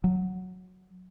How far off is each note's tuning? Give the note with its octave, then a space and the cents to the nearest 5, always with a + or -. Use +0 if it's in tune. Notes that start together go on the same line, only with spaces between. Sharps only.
F#3 -5